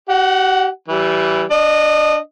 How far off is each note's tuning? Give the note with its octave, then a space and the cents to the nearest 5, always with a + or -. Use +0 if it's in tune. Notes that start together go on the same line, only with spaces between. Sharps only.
G4 -45 F#5 +0
E3 +0 G3 -25
D4 +0 D#5 -25